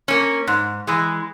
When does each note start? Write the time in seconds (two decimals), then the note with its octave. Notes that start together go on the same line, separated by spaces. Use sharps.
0.08 A#3 C#4
0.47 G#2
0.87 E3 G#3